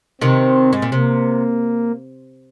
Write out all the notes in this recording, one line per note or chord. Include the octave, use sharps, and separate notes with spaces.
C3 D#3 C4
G#2
A#2
C3 A#3